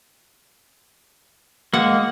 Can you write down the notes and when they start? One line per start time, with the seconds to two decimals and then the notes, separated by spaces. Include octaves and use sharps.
1.73 G#3 A#3 F#5